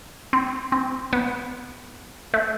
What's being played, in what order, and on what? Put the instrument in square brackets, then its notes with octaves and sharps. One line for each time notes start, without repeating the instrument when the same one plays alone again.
[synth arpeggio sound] C4
C4
B3
A3